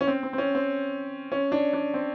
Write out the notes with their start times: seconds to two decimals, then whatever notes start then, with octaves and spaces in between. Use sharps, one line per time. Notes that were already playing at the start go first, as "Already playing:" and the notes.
0.01 C#4
0.07 C4
0.23 C4
0.33 C4
0.38 C#4
0.55 C4
1.32 C#4
1.52 D4
1.73 D4
1.94 C4